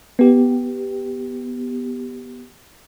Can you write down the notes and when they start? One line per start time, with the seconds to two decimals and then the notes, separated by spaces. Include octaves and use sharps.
0.19 B3 G4